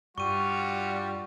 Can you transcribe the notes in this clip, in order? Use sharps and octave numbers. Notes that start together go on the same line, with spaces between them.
G2 G3 F4 F#4 C#6 D#7